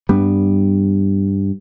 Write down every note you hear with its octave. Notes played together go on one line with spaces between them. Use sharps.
G2 G3 B3